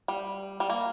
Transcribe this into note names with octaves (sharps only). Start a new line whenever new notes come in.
G3
G3
A#3